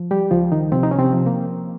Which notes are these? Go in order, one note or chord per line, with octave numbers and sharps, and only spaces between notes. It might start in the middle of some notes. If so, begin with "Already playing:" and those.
Already playing: F3
G3 G4
C#2 F3 F4
D#3 D#4
C3 F3 C4
D#4
C#4
C3 C4
F3
A#3